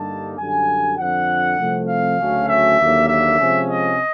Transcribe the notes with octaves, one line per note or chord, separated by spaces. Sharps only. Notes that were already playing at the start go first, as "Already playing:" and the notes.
Already playing: G2 D3 G3 A#3 D#4 A5
F#2 D3 G3 G#5
F2 D3 F3 F#5
C2 C3 F3 A3 C4
F5
D2 C#3 F#3 A3 C#4
E5
D#2 D3 F#3 A#3
E5
C3 F3 G#3 C#4
D#5